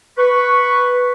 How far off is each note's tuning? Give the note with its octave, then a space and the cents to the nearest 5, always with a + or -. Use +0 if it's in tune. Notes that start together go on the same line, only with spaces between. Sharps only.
B4 +0 C#6 +0